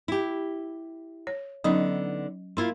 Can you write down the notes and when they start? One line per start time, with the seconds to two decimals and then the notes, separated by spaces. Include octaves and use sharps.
0.08 E4 G4
1.27 C#5
1.64 D3 F#3 B3 C#4 D#4 D#5
2.57 A#3 E4 F4 C6